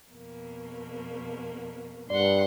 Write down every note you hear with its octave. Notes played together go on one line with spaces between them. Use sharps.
F2 B2 A#3
G2 D5 F#5 C6